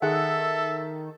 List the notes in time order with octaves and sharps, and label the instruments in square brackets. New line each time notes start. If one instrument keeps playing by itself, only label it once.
[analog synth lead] D#3 [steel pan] G#4 F#5 [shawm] A4 [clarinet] E5